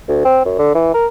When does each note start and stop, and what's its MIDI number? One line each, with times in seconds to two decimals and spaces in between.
0.08 0.22 38
0.25 0.42 60
0.45 0.58 42
0.59 0.73 50
0.74 0.90 52
0.94 1.06 70